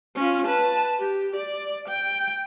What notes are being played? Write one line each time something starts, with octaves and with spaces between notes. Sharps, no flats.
C#4 F4
B4 A5
G4
D5
G5